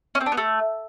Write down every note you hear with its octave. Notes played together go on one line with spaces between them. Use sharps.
C#4
C4
D4
B3
A3